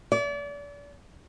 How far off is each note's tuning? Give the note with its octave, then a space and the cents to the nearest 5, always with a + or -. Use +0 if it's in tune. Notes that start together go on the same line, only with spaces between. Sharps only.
D5 -35